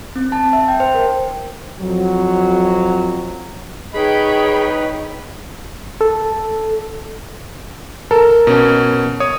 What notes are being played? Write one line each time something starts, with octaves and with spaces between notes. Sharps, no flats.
C4
A5
E5
G5
C5
A#4
F2 F#3
D#4 G#4 B4 C#5 G5 B5
A4
A4 A#4 A5
B2 C#4
C#5 D#6